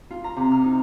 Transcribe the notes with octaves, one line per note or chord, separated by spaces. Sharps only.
F4
A#5
C3
F6
D#4